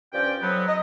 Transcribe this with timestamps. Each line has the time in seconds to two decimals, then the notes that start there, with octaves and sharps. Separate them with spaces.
0.13 G2 F3 C#4 D5 G5
0.42 F2 F#3 B3
0.68 D#5